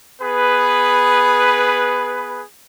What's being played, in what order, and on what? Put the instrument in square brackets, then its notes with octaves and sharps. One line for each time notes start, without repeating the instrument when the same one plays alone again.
[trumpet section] B3 G#4 B4